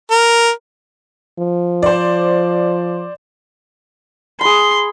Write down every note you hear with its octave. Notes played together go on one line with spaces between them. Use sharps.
A#4
F3
C5 D5
G#4 B5 C6